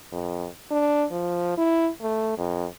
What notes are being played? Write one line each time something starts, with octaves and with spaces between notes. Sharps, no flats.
F2
D4
F3
E4
A3
F2